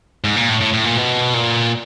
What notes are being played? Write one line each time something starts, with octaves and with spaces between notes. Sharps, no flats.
G#2
A#2
A2
A2
A2
A#2
B2
A#2